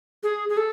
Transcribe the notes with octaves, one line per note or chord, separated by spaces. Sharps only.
G#4
G#4
A4